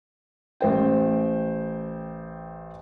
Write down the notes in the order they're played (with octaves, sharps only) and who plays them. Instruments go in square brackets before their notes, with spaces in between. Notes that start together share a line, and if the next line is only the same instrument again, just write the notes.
[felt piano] A1 C5 G5